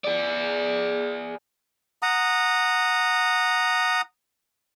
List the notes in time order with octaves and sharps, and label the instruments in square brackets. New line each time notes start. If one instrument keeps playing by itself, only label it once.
[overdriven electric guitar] G#4 D5
[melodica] F#5 A#5 D#6